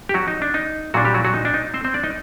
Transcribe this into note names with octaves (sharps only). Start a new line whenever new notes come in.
G4
F#3 F#4
D#4
D4
D#4
A#2 F#3 G3 D4 F#4
G3 G4
F#3 F#4
F#3 F#4
D#4
D4
D#4
C4 C5
C4 C5
D4 D5
D#4 D#5